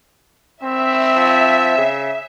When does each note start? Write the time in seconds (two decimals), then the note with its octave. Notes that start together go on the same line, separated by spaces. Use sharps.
0.63 C4 E5
1.16 F3
1.77 C#3